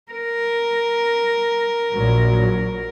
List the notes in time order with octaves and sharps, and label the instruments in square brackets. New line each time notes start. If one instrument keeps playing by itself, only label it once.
[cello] A#4
[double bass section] A#1 F#3